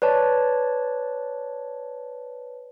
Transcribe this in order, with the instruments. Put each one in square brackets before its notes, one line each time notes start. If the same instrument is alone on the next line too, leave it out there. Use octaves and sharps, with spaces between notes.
[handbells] B4 C#5 D5 A5